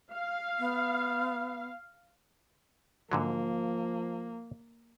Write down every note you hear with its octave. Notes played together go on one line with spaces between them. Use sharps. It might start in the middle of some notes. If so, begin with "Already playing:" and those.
F5
B3
G#2 D3 F3 F#3 A#3